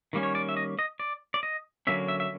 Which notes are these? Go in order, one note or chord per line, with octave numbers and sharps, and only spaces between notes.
D#3 G3 A#3 C#4
C#5
D5
E5
D#5
D#5
D5
D5
D#5
D3 F#3 A#3 C#4 E5
E5
E5